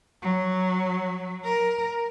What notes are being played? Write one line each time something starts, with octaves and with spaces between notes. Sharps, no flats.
F#3
A#4